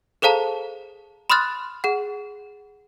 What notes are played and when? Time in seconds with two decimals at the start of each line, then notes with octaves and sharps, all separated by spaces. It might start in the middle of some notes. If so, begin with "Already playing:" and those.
0.22 G#4 A4 C5 F5 A5 A#5
1.30 B5 C6 D#6 F6 F#6 A6
1.84 G#4 F#5